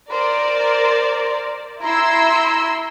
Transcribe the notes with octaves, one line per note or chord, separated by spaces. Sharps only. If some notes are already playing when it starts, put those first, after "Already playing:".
A#4 C5 D5
E4 A#5 C6 E6